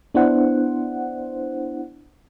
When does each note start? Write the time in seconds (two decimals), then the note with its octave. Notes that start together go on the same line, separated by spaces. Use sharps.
0.14 B3 D4 E4 C5 F#5